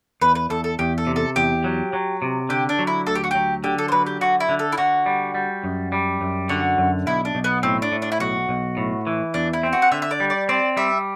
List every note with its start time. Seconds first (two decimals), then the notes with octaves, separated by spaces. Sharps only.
0.21 E2 B4
0.35 B4
0.50 E2 A4
0.64 A4
0.79 E2 G4
0.98 A4
1.07 C3
1.16 A4
1.36 E2 G4
1.64 F#3
1.93 F#3
2.22 C3
2.49 D3 G4
2.69 D4
2.79 F#3
2.87 E4
3.07 D2 A4
3.15 G4
3.24 F#4
3.31 F#3 G4
3.64 D3 G4
3.78 A4
3.88 C5
3.92 F#3 B4
4.06 G4
4.21 D3 F#4
4.40 E4
4.49 D3
4.59 A4
4.72 E4
4.78 D3 F#4
5.06 G3
5.35 G3
5.64 F#2
5.92 G3
6.21 F#2
6.49 D3 F#4
6.78 F#2
7.07 B1 E4
7.25 D4
7.35 B1
7.44 B3
7.63 A2 C4
7.82 D4
7.92 A2
8.02 D4
8.12 E4
8.20 B1 F#4
8.49 B1
8.77 A2
9.07 E3
9.34 E2 D4
9.53 E4
9.63 C4
9.73 F#4
9.82 F#5
9.92 D3 E5
10.02 E5
10.11 D5
10.20 G3
10.30 D5
10.49 C4 D5
10.77 G3 E5